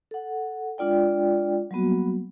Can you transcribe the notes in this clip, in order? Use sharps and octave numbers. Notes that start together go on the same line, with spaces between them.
A4 F#5
G#3 D4 F4 D5 G5
F#3 G3 A#3 B3 F#4